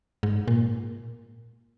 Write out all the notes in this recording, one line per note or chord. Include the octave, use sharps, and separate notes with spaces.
G#2
A#2